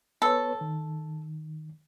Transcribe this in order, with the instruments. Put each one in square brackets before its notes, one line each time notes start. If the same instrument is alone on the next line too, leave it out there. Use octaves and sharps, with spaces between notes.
[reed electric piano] B3 B4 C#5 [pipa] A4
[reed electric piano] D#3